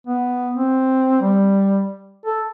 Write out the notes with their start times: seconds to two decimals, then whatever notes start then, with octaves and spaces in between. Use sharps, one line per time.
0.07 B3
0.56 C4
1.22 G3
2.26 A4